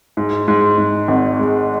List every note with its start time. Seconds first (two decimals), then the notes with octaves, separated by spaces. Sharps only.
0.17 G#2
0.48 G#2
0.78 G#2
1.08 G#1
1.39 G#3